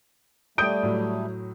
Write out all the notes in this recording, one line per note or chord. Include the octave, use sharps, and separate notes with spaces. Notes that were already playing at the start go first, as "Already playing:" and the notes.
G3 A3 D5 G5 D#6 G6 D7
A2 F#3